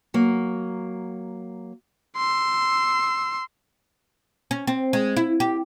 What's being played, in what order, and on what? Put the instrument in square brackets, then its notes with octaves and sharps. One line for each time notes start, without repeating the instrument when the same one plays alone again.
[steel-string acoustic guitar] F#3 A#3
[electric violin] C6 E6
[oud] C#4
C4
G#3
E4
G4